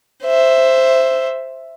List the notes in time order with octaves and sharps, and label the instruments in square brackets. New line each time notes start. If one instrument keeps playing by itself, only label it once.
[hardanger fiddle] C5 E5